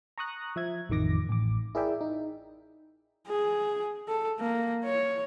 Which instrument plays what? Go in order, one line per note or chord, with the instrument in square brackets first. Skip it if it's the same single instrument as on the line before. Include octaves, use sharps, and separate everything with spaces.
[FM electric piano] A#5 C#6 D#6 F#6 A#6
F3 E5 G#6
A1 F2 D#3 D6 A#6
A1 D6
E4 G#4 A#4 D5 E5 G5
D#4
[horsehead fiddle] G#4
A4
A#3
C#5